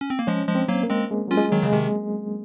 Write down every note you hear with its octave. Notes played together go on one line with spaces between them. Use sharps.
C#4
C4
A#3
F3 G#3 C#4
F3 G#3
C4
F#3 A#3
A#3
G#3 C4
G#3
F#3 C#4 F4
G#3
D#3 F#3
C#3 G#3
C3 D#3